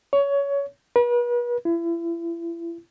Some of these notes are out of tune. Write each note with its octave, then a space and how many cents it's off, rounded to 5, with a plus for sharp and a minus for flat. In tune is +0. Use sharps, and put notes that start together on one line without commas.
C#5 +20
B4 -40
E4 +35